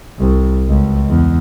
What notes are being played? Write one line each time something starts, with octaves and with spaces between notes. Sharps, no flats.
C2
C#2
E2